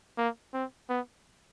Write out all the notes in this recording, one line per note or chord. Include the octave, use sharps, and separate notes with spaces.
A#3
C4
B3